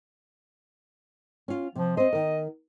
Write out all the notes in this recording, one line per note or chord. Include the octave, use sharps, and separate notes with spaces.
C#4 F4
C3 F3
C4 C5 D#5
D#3 A#4